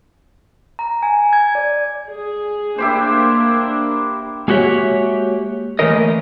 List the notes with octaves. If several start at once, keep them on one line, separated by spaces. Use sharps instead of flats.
A#5
G#5
G#6
D5
G#4
A#3 D4 E4 G4 C5
G#3 A#3 F#4 G4 C#5 E5
E3 A3 A#3 C#4 A#4 D#5